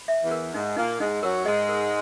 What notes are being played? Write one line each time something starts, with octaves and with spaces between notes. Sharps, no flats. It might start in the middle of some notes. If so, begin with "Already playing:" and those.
Already playing: B5
E5
E2 E3
A#4
G#2 G#3 D#4
A#2 A#3 D#4
G#2 G#3 D#4
F#2 F#3 A#4
G#2 G#3 D#5
A#4